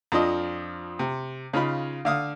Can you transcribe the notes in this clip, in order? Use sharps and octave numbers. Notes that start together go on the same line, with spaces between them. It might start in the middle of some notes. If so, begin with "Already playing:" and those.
F2 F3 D4 D#5
C3
C#3 D#4 F4 B5
D3 F5 D#6